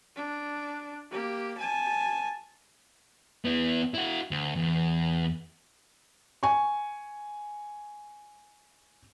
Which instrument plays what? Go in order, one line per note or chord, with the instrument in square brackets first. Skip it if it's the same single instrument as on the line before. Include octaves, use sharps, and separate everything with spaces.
[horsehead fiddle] D4
A#3 G4
G#5 A5
[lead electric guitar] B3 E4
E4 F#4
D2
E2
[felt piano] G#5 C#6